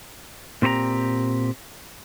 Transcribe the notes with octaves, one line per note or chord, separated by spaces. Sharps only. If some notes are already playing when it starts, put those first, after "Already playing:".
A#2 C4 G4 C5 A#5